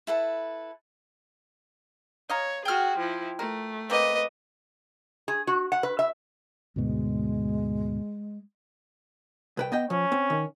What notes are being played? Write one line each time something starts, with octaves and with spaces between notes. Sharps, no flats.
E4 A4 B4
C#5 D#5 F5 A#5
F#4 G#4 G5 F6
F3 E4
A3 A#4
A#3 C4 B4 D#5
G#4
F#4
F#5
B4
E5
D2 G#2 B2 G#3
C2 B4 G5
B3 D#5 G5
F3 C#4
C4
D#3